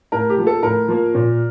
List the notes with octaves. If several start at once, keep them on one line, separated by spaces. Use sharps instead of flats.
A2 A#4
G4
F3 A#3
A4
A2 A#4
F3 A#3
A#2